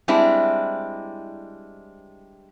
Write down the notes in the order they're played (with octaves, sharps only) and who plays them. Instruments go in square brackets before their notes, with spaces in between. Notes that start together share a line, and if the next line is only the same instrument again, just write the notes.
[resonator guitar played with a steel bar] G3 G#3 C4 D4 E4